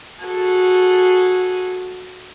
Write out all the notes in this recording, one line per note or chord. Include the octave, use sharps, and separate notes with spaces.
F#4 G#4 A4